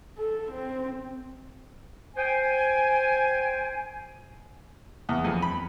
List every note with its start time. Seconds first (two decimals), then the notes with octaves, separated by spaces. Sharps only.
0.18 A4
0.52 C4
2.16 C5 G5 G#5
5.09 E2
5.24 F2
5.42 B5